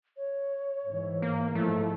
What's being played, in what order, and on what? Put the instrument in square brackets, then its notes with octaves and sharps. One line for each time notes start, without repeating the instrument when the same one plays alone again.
[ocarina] C#5
[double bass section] G#2 E3
[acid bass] A#3
[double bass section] G#2 F3 [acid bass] A3 [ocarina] E4